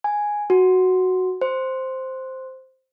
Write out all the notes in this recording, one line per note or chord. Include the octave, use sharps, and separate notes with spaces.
G#5
F#4
C5